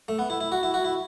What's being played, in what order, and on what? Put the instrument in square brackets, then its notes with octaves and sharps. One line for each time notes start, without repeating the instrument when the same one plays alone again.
[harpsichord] A3
B3
E4
E4
F#4
E4
F#4
E4